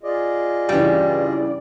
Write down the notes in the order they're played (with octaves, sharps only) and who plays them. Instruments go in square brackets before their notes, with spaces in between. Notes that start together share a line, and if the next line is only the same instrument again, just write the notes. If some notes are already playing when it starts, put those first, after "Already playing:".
[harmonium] F4 G#4 D#5 [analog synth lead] D5
[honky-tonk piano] G2 C#3 E3 [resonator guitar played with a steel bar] G3